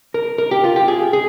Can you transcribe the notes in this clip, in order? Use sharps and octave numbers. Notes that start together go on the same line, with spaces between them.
A#4
A#4
G4
F4
G4
G#4
G#4